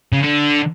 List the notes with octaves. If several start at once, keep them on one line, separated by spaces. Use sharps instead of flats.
C#3
D3